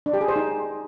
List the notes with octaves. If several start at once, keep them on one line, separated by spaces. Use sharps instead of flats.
D4
G4
G#4
C5
D#4